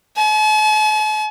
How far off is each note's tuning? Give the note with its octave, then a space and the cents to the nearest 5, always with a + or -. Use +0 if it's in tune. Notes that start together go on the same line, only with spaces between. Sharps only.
A5 -45